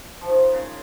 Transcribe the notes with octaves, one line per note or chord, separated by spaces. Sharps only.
F3
D#3
C#3